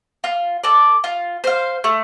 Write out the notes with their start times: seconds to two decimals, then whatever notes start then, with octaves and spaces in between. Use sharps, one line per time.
0.24 F4
0.64 A4 D5
1.04 F4
1.44 C5 F5
1.84 A3